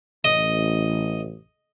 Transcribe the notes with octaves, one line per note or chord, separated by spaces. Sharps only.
A1 D#5